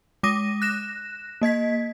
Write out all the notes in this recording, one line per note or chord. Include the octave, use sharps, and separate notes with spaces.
G#3 D6 D#6 A#6 D#7
F#6 A#6 E7
A#3 D#5 G#6 B6